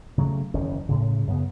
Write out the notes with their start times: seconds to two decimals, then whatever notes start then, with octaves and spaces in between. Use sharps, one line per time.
0.18 C#3 F#3 A3
0.54 F#1 E2 D#3 C#4
0.89 A2 C#3
1.27 F#2 C#3 B3